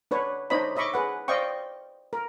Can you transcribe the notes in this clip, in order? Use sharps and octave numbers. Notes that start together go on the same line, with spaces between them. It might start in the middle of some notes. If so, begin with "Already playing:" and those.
D4 B4 C#5
D4 D#4 C5 C#5 D#5 B5
C#5 D#5 E5 B5 C#6 D6
G#4 B4 F#5
C5 D5 D#5 F5 G5 C#6
A#4